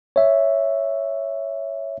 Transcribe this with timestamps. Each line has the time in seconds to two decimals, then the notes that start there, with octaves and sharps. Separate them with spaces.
0.16 C#5 E5